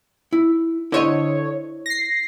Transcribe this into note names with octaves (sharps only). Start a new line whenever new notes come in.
E4
D3 E4 C5 C#5 D#5
A#6 C7